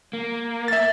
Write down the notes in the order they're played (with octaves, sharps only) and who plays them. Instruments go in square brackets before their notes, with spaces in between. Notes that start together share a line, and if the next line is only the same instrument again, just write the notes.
[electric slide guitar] A#3
[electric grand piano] E5 A6